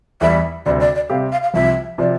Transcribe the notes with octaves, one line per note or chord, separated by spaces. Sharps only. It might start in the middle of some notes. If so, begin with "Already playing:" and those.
E2 E3 G3 E5
D2 C3 G3 C4 D5
D5
D5
C3 G3 C4 G4 F5
F5
F5
C2 C3 F3 C4 E5
C3 F3 D5